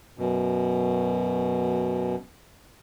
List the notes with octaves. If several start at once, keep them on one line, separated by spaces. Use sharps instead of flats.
F#2 B2